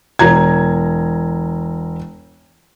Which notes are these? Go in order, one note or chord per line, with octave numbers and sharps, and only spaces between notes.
E1 A#5 G#6